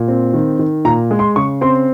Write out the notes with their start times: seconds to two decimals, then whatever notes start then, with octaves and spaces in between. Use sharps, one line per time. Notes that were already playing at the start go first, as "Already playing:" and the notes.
Already playing: A#2
0.08 C4
0.34 D#3
0.59 D#3
0.85 A#2 A#5
1.11 G#3
1.19 C6
1.36 C#3 C#6
1.61 C4 C6